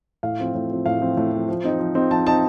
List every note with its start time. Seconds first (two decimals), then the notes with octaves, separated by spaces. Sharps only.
0.23 A2 F5
0.39 F3 C4
0.54 A2
0.70 F3 C4
0.86 A2 F5
1.01 F3 C4
1.17 A2
1.33 F3 C4
1.49 F3
1.64 C4 D#4
1.80 F3
1.95 C4 D#4
2.11 F3 A5
2.27 C4 D#4 A5